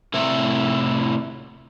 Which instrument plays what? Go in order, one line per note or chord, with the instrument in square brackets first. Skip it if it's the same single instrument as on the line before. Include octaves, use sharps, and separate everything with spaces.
[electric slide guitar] A2 C3 E4